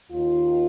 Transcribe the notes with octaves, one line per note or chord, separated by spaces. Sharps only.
D#2 D#3 F4